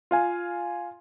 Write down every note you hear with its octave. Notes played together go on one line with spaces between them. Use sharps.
F4 F5 G#5